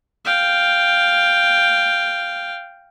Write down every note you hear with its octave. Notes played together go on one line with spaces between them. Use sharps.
F5 G5